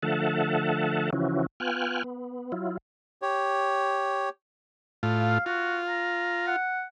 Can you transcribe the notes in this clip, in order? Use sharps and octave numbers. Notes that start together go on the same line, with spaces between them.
D3 F3 A3 E5 F#5 A5
C#3 E3 F3 C#4 E4 F#4
B3 F4 G5 G#5 F6 F#6
B3
F#3 E4 F4
G4 C#5
A2 F4
F5
F4 F#4
A#5
F#5